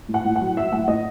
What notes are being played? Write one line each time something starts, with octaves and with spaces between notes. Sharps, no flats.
A2
F#5
A2
F#3 F#5
F#3 E5
A2 F#5
A2 D#5